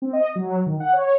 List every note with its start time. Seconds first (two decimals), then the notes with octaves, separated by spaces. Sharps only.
0.02 C4
0.13 D#5
0.35 F#3
0.66 D#3
0.80 F#5
0.93 C#5